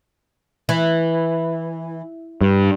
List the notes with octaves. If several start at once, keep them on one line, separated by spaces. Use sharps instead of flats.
E3
G2